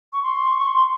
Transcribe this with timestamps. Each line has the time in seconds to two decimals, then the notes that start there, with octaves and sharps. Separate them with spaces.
0.12 C#6
0.23 C6
0.45 C#6
0.59 C#6
0.67 C6